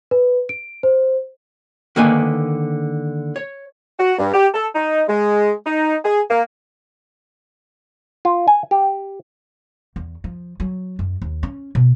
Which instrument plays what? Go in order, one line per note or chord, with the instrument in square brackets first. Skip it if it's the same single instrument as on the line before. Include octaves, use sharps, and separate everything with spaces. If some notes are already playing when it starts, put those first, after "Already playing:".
[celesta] B4
D7
C5
[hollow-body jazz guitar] D3 D#3 A#3 B4 G#5
C#5
[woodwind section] F#4
G2
G4
A4
D#4
G#3
D#4
G#4
A#3
[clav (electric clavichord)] F4
G#5
G4
[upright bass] E2
F3
F#3
F#2
D#2
C#4
B2